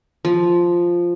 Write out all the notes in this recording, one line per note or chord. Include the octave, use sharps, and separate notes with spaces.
F3